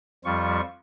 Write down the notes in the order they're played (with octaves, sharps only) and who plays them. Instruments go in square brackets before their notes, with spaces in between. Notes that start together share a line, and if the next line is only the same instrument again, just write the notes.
[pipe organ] F2 F3 G3 F4 C#6